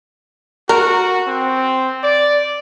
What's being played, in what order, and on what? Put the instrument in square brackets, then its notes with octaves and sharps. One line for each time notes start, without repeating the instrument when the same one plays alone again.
[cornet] F#4 [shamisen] A#4
[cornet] C4
D5